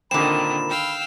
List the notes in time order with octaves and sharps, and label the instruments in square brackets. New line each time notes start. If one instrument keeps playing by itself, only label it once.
[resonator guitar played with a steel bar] A#2 C4 [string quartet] D3 D#3 [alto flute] B5 [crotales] E7
[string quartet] F5 G5 E6